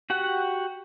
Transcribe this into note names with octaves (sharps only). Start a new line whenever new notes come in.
F#4 G4 F#5